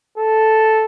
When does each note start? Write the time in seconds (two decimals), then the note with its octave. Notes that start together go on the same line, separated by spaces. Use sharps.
0.18 A4